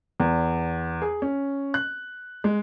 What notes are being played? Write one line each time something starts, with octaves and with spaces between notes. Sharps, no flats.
E2
G#4
C#4
F#6
G#3